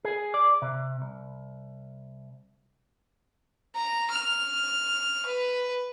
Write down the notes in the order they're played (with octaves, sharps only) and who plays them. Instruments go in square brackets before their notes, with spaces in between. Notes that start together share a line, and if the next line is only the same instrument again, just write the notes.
[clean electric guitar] G#4
D5
C3
C2
[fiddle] A#5
F6
B4